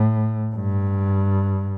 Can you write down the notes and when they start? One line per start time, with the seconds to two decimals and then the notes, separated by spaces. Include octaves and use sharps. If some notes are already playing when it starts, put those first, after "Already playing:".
Already playing: A2
0.55 G2